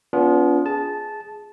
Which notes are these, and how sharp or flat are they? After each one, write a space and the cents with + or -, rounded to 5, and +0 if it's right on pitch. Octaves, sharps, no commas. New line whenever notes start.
B3 +0 D4 -40 F4 +0
G#4 +0 A5 -10